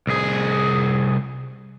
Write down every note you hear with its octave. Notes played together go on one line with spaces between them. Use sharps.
C2 G#4